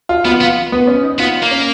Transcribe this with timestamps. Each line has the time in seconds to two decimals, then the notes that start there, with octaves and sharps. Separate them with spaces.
0.09 F4
0.25 B3 F4
0.41 B3
0.72 B3
0.87 C#4
1.03 D#4
1.19 B3 F4
1.43 A#3
1.51 C#4